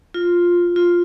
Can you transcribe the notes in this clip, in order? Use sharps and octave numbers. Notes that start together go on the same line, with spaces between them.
F4
F4